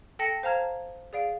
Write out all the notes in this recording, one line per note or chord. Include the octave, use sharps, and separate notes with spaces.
A4 G5 A5 A#6 C#7
C5 F5 A5 A#5 F6 G#6
G#4 D5 F5 D7